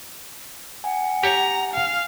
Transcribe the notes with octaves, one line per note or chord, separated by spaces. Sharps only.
F#5 G#5
G4 C#5 A#5
F5